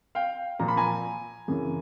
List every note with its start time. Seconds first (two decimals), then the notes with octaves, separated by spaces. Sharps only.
0.15 F5 G5
0.59 A#2 F3 A#5
0.68 B5
0.77 G#5 A#5
1.48 F#2 C#3 E3